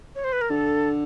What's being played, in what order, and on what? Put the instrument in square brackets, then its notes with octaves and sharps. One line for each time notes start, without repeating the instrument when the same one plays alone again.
[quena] C#5
C5
B4
A#4
[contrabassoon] D3 [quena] A4